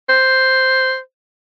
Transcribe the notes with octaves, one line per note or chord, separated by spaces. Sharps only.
C5